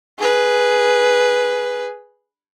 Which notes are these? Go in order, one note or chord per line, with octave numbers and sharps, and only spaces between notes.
G#4 B4